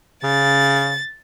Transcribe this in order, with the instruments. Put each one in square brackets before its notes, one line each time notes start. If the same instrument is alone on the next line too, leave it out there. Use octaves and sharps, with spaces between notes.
[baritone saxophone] C#3 [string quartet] A6